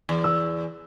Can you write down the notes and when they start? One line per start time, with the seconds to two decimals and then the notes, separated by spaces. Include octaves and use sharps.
0.09 E2
0.24 E6